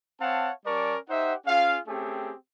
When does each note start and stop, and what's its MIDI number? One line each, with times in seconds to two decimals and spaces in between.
0.20 0.51 60
0.20 0.51 73
0.20 0.51 77
0.20 0.51 78
0.20 0.51 81
0.66 0.96 55
0.66 0.96 61
0.66 0.96 70
0.66 0.96 74
0.66 0.96 81
0.66 0.96 85
1.09 1.34 63
1.09 1.34 67
1.09 1.34 72
1.09 1.34 76
1.09 1.34 78
1.46 1.78 61
1.46 1.78 65
1.46 1.78 68
1.46 1.78 77
1.87 2.34 57
1.87 2.34 60
1.87 2.34 61
1.87 2.34 67
1.87 2.34 68